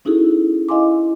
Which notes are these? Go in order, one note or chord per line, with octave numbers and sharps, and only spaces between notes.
C#4 D#4 E4 F#4 G#4 A4
E4 D#5 F5 G#5 C6 D6